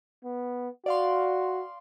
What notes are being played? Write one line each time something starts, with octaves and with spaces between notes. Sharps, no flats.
B3
F#4 D5 F5 C6